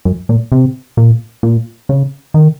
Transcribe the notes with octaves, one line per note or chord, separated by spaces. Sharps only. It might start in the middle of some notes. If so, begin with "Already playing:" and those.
F#2
A#2
C3
A#2
A#2
C#3
D#3